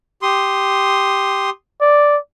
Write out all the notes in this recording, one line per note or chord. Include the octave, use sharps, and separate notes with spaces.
G4 C6 D#6
D5